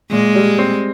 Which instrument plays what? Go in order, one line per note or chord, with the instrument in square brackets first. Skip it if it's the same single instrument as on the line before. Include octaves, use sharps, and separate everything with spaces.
[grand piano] A#2 [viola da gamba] G#3
[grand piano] G3
C4